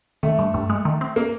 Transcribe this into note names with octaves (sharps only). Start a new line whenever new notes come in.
D#3 A3
G2
G2
G#3
D#3
C4
A#3